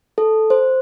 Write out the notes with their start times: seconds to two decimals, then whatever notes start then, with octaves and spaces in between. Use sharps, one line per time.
0.18 A4
0.50 C5